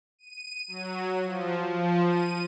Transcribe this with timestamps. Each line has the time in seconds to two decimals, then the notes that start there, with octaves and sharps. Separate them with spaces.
0.19 D#7
0.68 F#3
1.24 F3
1.68 F3
2.08 D#7